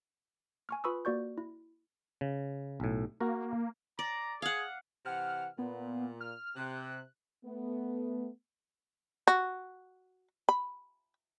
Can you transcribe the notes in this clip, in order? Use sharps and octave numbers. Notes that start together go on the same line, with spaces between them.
G#5 C#6 F6
F4 B4 B5 C#6 D#6 E6
A#3 F#4 D5 C#6 G6
E4
C#3
B1 A2
A#3 F#4 A#4
D5 A#5
G#4 F5 F#5
C3 E3 F#5 F6
A#2 B3
F6
C3 F#6
A3 B3
F#4
B5